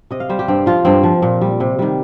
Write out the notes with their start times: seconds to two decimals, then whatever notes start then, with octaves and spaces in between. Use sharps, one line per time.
0.11 C3 D#5
0.20 F5
0.29 G3 C5
0.39 G4
0.48 G2 C4
0.66 F3 F4
0.85 G2 C4
1.03 F3
1.22 A#2
1.41 G3
1.60 C3
1.79 D#3 G3